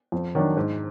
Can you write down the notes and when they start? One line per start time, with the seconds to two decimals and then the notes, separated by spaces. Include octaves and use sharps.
0.12 F2
0.35 D#3 F#3 D4
0.57 G#2